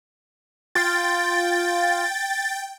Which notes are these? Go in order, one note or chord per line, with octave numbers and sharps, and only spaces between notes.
F4 G5 A6